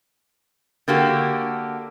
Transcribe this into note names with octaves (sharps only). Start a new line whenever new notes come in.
D3 A#3 F#4 G4